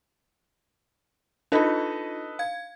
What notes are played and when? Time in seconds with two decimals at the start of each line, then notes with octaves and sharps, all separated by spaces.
1.52 D4 D#4 F4 A4 B4 D#5
2.39 F5 G#6